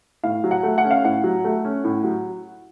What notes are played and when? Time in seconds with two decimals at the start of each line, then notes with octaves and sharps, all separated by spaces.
0.23 A2 F5
0.44 F#3
0.51 F#5
0.63 A3
0.78 F#5
0.84 C#4
0.91 F5
1.05 A2 F#5
1.24 F#3
1.45 A3
1.65 C#4
1.84 A2
2.04 F#3